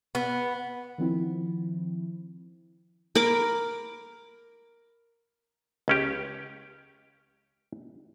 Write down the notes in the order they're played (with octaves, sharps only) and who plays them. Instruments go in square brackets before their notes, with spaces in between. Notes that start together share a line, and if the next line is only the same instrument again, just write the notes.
[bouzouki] B3
[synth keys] D#3 F3 C4 E4
[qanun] A#4 B5 D6
[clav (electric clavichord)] C#2 C#4 G4